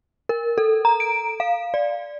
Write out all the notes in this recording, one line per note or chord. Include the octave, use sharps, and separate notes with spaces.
A#4
A4
A#5
D7
F5
D5